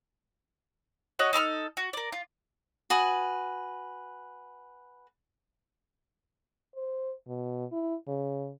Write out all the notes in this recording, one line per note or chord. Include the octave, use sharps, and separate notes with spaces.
F#4 C#5 D#5 F#5
D#4 A4 C6 F6
F#4
A#4 D5
F4
F#4 B4 G#5 D#6
C5
B2
E4
C#3